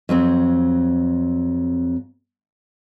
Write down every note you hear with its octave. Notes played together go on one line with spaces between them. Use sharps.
F2 F#3 C4